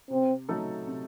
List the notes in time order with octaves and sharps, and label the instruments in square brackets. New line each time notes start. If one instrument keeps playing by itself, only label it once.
[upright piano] C3 [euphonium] C4
[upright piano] F#3 A3 D#4 A4
C3